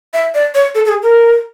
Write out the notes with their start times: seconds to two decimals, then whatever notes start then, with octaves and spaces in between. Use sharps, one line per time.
0.14 E5
0.34 D5
0.55 C#5
0.75 A4
0.85 A4
0.89 G#4
1.03 A#4